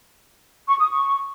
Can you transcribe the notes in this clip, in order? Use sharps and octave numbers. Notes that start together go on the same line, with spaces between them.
C#6
D#6
C#6